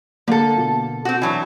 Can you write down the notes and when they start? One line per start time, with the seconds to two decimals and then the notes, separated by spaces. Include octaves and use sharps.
0.28 D3 A#3 A4
0.57 B2
1.05 C4 F#4
1.22 E3 F#3 D4